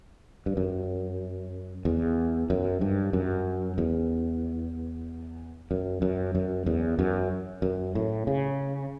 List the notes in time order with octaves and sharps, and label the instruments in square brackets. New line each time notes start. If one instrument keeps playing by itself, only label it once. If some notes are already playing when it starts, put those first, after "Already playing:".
[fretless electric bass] G2
F#2
E2
F#2
G2
F#2
E2
F#2
F#2
F#2
E2
F#2
F#2
A2
C#3